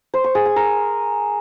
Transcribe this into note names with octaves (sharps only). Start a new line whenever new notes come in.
C5
C#6
G#4
G#5
A#4